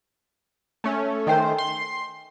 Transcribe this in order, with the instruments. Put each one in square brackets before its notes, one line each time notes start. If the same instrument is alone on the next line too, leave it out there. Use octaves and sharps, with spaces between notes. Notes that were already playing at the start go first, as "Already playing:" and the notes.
[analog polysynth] A3 C#4
[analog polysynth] D#3 A3 C5 [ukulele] A#4 G5 G#5
[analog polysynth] C6